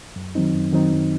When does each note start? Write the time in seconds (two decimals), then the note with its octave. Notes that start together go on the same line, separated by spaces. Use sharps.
0.16 F#2
0.35 D#3 F#3 C4 D#4
0.54 F#2
0.73 D#3 F#3 C4 D#4
0.91 F#2